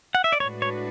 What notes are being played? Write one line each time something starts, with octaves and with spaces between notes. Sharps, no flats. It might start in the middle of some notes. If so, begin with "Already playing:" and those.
F#5
E5
D5
A2 G#3 D4 F#4 B4 C#5
C#5